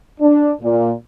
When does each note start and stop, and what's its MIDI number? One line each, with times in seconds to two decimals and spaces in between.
0.20 0.52 62
0.62 0.91 46